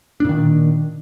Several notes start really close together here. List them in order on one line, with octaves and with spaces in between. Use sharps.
D4 A#2 D#3